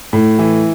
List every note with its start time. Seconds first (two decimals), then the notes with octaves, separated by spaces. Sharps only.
0.13 A2
0.39 E3